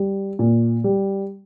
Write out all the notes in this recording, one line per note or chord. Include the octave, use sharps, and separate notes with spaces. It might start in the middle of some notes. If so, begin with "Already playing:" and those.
Already playing: G3
A#2
G3